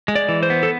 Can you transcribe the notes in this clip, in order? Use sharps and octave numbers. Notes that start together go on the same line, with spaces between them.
G#3
D5
E3
C5
B3
A4